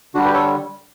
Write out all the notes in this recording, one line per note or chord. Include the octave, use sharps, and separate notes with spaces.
D3 G3 D4 F#4
G4 B4
A4 C#5